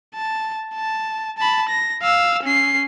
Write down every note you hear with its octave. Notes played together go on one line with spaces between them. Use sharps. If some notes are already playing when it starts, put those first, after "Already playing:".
A5
A5
A5 B5
A#6
F5 E6
C#4 C7